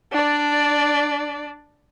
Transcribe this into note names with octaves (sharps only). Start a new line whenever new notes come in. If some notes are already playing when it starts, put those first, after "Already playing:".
D4 D5